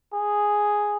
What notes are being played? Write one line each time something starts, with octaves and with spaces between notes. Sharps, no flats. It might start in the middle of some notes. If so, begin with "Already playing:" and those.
G#4